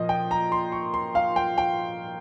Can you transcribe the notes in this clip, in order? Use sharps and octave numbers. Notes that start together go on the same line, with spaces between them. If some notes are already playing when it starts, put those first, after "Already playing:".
Already playing: A#2 F3 D#5
G5
A#5
C6
C#6
C6
F5
G5
G5